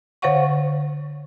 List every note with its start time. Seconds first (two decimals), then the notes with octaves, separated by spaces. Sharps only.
0.22 D3 C5 C#5 F5 F#5 C#6